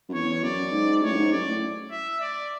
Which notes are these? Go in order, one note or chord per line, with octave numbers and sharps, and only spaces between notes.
F#2
E2 C#5
F#2 D5
G#2
A2 C#5
F#2
G#2
F#2 D5
A2
E5
D5